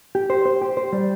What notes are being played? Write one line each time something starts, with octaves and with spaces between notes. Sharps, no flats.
G4
C5
C5
G4
C5
G3